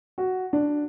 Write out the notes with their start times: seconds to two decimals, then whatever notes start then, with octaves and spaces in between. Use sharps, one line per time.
0.18 F#4
0.53 D4